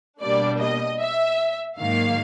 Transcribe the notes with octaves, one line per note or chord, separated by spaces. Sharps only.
B2 G3 A#3 D4 D5
D#5
E5
G#2 D#3 F#3 A#3 F5